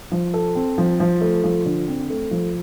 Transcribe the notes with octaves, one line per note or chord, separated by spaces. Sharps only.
F3
A4
C4
F3
F3
A3
F3
D3
C4
A3
F3